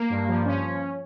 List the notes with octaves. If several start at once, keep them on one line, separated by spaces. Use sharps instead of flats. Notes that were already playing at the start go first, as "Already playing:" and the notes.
Already playing: A#3
G2
F3
C#4